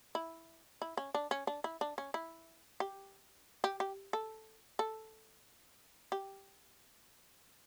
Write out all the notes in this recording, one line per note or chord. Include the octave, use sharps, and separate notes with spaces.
E4
E4
C#4
D4
C#4
D4
E4
D4
C#4
E4
G4
G4
G4
A4
A4
G4